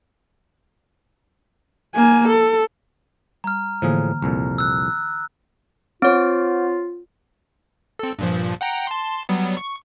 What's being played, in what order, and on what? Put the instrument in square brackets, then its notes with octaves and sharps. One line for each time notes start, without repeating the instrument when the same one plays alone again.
[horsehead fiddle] A#3 G#5
A4
[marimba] G3 [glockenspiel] A#5 F6
[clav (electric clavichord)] A2 F3 G#4 [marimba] D3 E3 A#3
[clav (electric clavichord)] C2 F2 A#2
[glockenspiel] E6 F#6
[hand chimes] C4 C#5 [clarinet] F4
[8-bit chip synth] C4 A4
G2 A#2 F3
F#5 G5 A#5
A5 C6
F#3 G3 B3
C#6